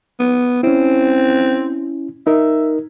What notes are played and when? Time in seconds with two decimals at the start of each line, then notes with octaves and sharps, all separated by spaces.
0.20 B3
0.63 C4 C#4 E4
2.27 D#4 A#4 E5